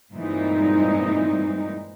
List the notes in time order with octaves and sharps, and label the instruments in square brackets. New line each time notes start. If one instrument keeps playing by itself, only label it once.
[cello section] G2 A#2 E3 G#3 C4 D#4